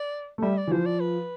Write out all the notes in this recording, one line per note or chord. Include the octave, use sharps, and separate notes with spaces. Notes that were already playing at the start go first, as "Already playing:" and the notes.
Already playing: D5
A3
G3 E5
D5
E3
F3 C5
D5
B4